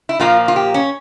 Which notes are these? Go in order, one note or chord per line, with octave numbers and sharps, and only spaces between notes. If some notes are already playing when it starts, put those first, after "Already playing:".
E4
A#2 F3 A#3 F4
F4
G4
C#4